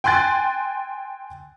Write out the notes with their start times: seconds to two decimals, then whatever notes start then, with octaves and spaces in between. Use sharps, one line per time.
0.04 G5 G#5 C6 F#6 A6